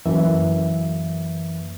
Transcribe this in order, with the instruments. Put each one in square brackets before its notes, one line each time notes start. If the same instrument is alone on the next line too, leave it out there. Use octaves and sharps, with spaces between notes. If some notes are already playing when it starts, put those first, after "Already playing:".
[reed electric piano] F#2 E3 A#3 E5